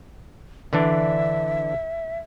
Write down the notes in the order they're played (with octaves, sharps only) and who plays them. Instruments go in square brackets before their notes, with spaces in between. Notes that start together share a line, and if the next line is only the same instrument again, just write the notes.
[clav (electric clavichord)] D3 E3 D4 [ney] E5